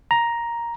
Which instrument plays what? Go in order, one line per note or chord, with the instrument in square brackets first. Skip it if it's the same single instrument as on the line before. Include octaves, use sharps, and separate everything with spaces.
[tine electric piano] A#5